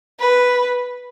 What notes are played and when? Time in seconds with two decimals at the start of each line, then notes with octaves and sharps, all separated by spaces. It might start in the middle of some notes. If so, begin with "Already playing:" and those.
0.19 B4